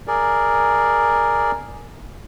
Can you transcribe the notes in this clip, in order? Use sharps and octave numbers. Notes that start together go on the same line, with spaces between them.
G#4 A#4 D5